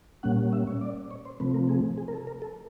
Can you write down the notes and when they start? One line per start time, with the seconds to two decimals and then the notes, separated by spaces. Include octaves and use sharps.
0.23 A#2 G3 A#3 C#4 F#5
0.53 E5
0.67 C#5
0.81 D5
1.11 C#5
1.25 C5
1.40 C3 F3 A3 C4 B4
1.54 A#4
1.69 G#4
1.98 G#4
2.08 A#4
2.13 A4
2.27 A#4
2.42 A4